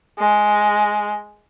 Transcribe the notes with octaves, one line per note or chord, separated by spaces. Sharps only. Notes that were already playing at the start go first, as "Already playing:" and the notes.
G#3